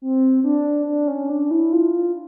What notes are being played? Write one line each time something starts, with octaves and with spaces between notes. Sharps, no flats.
C4
D4
D4
C#4
D4
E4
F4